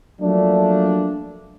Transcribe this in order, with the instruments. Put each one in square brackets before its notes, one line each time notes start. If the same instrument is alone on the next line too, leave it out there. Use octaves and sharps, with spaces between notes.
[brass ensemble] F3 F#3 A3 A#3 D4